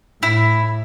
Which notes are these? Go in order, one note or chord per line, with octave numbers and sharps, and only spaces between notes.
A2 E4